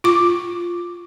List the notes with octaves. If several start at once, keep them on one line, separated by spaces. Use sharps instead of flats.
F4 D6